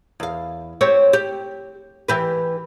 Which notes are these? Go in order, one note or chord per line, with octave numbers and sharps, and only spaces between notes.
E2 F5
C4 G4 C#5
G4
E3 G4 B4